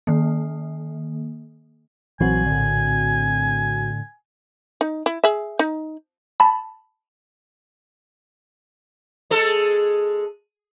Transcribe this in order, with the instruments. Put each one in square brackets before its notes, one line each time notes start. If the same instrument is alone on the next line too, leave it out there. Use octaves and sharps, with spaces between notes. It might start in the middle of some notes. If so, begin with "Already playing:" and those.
[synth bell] D#3 A#3
[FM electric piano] A#1 C4 F#4 [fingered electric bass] E3 F#3 [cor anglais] G#5
[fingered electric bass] A2 D3
[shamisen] D#4
E4
G#4 E5
D#4
[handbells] A5 B5
[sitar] G#3 A4